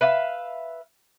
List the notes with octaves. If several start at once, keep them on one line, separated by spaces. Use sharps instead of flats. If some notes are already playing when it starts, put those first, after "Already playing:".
B4 E5 F5